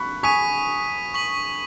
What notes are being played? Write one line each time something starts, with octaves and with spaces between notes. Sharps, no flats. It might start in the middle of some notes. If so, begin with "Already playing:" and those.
Already playing: B5 C#6 F#6
G#5 C#6 D#6 B6 D#7
C#6 B6 F#7